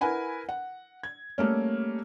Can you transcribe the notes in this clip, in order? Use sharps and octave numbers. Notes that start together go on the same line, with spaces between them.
E4 A#4 B4 F#5 G#5 B5
F#5
G#6
G3 A3 A#3 C#4